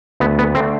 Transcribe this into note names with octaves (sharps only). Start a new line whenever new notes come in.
D2 B3
B3
D3 A3 C4